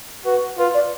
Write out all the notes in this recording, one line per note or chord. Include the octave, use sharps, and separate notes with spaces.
F#4 B4
F4 B4
D5